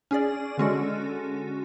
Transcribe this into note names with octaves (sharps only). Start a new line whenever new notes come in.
C#4 G#4 D5
D3 G#3 C#4 F#4 A4